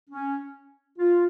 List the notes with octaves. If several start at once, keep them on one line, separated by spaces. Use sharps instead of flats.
C#4
F4